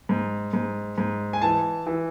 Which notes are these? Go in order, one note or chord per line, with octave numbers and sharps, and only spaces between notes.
G#2
G#2
G#2
G#5
E3 A5
E3